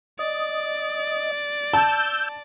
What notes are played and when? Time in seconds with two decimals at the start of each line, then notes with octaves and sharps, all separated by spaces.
0.19 D5 D#5
1.73 A5 E6 G6